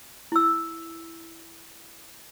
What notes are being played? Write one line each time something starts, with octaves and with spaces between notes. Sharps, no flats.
E4 E6